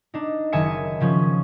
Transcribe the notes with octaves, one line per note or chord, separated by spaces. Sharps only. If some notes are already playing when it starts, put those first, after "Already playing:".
D4 D#4
F#1 D#3 E5 G#5 D#6 C#7
C#3 F3 C#4